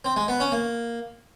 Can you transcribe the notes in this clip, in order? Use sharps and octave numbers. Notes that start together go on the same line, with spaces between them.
C4
G#3
B3
C#4
A#3